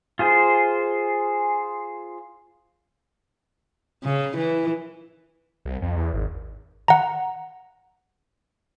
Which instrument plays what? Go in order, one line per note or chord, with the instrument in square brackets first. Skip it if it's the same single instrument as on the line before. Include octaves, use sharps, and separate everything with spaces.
[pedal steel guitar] F4 G#4 C5
[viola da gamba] C#3
E3
[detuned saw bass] C2
F2
E2
G#1
[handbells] F#5 A#5